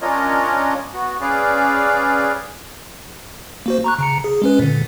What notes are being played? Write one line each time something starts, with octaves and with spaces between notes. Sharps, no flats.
C#4 D4 F4 A#4 C#5 D#5
B3 F#4
C#4 G#4 B4 D5 F5
A#3 F#4 C5
A#5 C#6 F#6
C#3 A#5 C#7
G#4
G#3 C#4 B4
A#2 D3